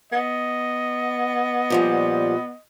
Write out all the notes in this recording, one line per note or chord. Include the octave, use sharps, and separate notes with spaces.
B3 D#5
A#2 F3 G3